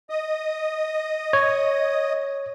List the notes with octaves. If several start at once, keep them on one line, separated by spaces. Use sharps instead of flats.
D#5 D#6
C#5